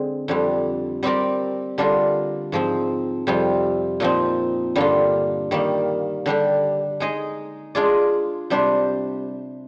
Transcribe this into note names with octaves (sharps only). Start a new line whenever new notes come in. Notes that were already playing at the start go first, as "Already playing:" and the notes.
Already playing: D3 G#3 C4
F2 D3 G3
G3 C4 G4 A#4 D5
D3 G3 D4 F4 A#4
G#2 F3 C4
F2 C3 G3 C4 F4
A#2 F3 C4 D#4
G2 D3 G3 A#3 F4
D#3 G3 A#3
D3 G3 D4 G4
G#3 D#4 G#4 D#5
G#3 D4 F4 G#4 D5
C3 G3 D4 G4 C5